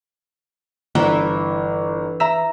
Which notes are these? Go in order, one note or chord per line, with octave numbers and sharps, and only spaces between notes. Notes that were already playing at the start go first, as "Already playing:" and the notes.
G1 E3 A#5
E5 A#5